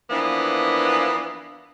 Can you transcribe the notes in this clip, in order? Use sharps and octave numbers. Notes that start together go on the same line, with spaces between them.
E3 F3 A#3 B3 D4